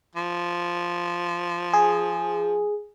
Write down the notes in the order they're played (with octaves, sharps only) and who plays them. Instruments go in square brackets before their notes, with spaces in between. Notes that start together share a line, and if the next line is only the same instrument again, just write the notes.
[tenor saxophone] F3
[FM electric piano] G#4